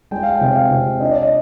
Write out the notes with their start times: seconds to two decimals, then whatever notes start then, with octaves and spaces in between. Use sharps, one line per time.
0.11 G#3 G5
0.23 F5
0.35 G5
0.41 C3
0.56 F5
0.71 C3
1.00 D4 D#5
1.11 D5
1.22 D#5